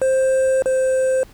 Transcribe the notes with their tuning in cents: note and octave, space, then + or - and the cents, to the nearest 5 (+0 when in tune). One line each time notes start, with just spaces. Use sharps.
C5 +10
C5 -5